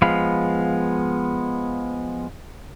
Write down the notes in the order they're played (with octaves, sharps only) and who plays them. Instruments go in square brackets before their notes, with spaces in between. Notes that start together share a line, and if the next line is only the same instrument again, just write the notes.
[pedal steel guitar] F3 G#3 B3 F5 B5